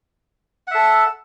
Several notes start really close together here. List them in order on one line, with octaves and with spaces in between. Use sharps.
F#5 E5 A4